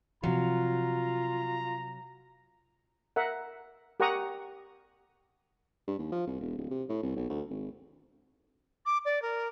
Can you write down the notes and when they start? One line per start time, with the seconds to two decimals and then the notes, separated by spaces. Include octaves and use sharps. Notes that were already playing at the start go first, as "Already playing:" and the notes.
0.23 C3 F3 F#3 F4 A#5
3.16 A#4 E5 F#5
4.00 G4 A#4 F#5 A#5 C#6 D#6
5.88 G2
5.99 D#2
6.12 F3
6.27 C2
6.40 E1
6.58 D1
6.71 C3
6.89 A2
7.03 C2
7.16 B1
7.30 D2
7.50 G#1
8.86 D6
9.05 D5
9.22 A#4